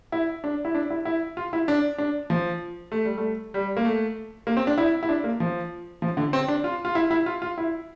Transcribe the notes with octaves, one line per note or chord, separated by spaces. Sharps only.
E4
D4
E4
D4
E4
E4
F4
E4
D4
D4
F3
A3
G3
A3
G3
A#3
A3
A#3
C4
D4
E4
E4
D4
A#3
F3
F3
D3
C4
D4
F4
F4
E4
E4
F4
F4
E4